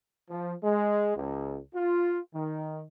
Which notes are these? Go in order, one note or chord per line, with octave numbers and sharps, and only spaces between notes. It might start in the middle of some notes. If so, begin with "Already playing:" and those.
F3
G#3
C#2
F4
D#3